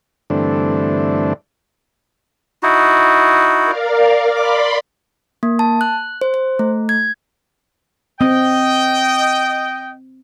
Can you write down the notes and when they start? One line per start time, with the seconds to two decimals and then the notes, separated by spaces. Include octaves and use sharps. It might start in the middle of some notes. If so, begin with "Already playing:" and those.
0.30 G2 D3 E3 A3 C4 D4
2.63 D#4 E4 F#4
3.65 A#4 D5 F5
4.36 D5 B5 C6 D6
5.43 A#3
5.59 A5
5.81 F#6
6.21 C5
6.34 C5
6.59 A3
6.89 G#6
8.21 C4 D#5 G5